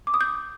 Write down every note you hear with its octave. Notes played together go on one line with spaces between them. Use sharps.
D6
D#6
G6